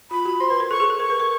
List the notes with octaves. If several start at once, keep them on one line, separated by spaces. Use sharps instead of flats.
F4 B5
F#4
C5 C6
B4
A#4
A4 C#6
G#4
A4
A#4 C#6
B4
A#4